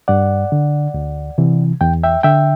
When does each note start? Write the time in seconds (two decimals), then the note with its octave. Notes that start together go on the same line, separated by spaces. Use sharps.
0.08 G2 D5 F#5
0.52 D3
0.94 D2
1.38 C3 E3
1.81 E2 G5
2.04 E5 G5
2.23 D3 E5 G5